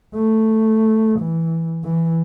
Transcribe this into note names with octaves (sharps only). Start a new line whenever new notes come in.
A3
E3
E3